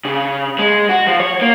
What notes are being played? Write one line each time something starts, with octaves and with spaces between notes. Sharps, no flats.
C#3
G#3
F#4
F3
C#5
A#3